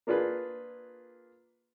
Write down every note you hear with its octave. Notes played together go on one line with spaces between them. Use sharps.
A#3 D4 F4 G#4 B4